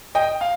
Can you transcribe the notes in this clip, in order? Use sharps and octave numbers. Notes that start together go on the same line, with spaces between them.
D#5 G5
F5